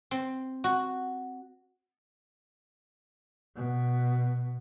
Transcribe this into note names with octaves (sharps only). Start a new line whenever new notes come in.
C4
F#4
B2